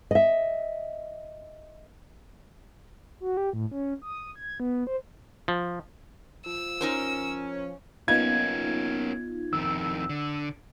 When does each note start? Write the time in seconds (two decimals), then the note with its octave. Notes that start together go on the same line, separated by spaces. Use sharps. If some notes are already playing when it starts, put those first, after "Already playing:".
0.11 D#5 E5
3.20 F#4
3.37 G4
3.53 A2
3.71 C#4
4.02 D#6
4.36 G#6
4.60 B3
4.87 C5
5.48 F3
6.46 F3 E6
6.81 C#4 D#4 A#4 C5
8.08 A#3 B3 C#4 D#4 F4 G#6
9.53 F2 D#3 E6
10.09 D3